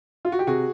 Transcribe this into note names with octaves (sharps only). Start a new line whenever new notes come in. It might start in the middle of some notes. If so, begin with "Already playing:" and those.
F4
F#4
G4
C3 F#4 G#4